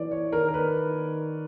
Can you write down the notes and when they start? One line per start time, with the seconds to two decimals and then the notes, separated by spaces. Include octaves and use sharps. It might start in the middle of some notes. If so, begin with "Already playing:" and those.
Already playing: E3 C#5 D5
0.11 C#5
0.32 D#3 A#4
0.48 A#4
0.54 B4